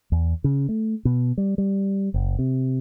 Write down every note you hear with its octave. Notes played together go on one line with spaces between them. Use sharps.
E2
C#3
A3
B2
G3
G3
F#1
C3